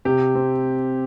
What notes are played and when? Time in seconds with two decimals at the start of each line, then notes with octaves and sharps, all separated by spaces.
0.05 C3 G4
0.35 C4